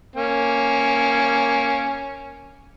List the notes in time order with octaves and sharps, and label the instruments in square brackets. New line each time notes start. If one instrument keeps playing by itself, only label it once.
[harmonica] A#3 C#4